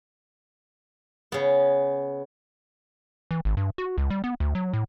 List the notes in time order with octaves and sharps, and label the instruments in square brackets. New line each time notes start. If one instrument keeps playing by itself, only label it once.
[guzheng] C#3 B3
[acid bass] E3
G#1
G2
F#4
C#2
G3
B3
D2
F#3
A2